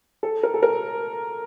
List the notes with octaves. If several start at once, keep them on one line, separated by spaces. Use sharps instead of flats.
A4
A#4
A4
A#4